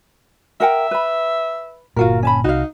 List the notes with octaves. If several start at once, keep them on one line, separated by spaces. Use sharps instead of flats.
A#4 E5 F#5 G5
B4 B5
G1 A#2 F4 F#4 A#4
C#4 A5 B5
C2 D#4 F#4 F5